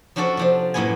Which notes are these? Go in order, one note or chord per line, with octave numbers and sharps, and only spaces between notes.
F3 C#4 D4 F#4 A4
C3 F3 D4
F#2 A2 A#3 B3 G#5